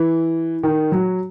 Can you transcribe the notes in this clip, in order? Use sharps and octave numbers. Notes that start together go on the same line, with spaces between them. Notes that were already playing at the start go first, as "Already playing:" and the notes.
Already playing: E3
D#3
F#3